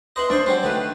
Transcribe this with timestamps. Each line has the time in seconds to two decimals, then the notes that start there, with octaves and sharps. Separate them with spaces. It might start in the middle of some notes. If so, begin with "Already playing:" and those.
0.16 E4 B4 D#5 C6
0.30 D4 C5 E5 C#6 D#6
0.46 F#3 G3 C#4
0.63 D#3 A3 B4